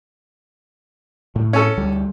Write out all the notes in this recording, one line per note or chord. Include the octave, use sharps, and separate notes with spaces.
A2
C#4 A4
D2 G3